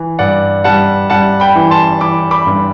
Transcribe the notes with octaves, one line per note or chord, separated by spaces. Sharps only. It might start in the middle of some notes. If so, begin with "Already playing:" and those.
Already playing: E3
G2 D5 F#5
G3 F#5 A5
G3 F#5 A5
G5 B5
E3
A5 C6
E3 B5 D6
B5 D6
G2